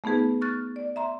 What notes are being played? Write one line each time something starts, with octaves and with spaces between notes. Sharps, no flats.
A3 B3 D#4 G#4 B4
C#6 F6 F#6 A6
D5
E5 A#5 C6